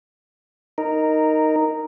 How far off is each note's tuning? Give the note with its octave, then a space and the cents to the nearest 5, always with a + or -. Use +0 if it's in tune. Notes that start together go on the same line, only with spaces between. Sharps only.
D#4 +0 A#4 -10